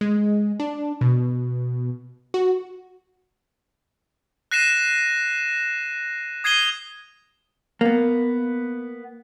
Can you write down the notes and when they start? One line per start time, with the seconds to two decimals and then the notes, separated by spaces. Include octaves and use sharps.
0.01 G#3
0.60 D4
1.01 B2
2.34 F#4
4.51 F#6 A#6 C7 D#7 E7
6.44 D#6 G#6 C7 D#7 G7
7.81 A#3 B3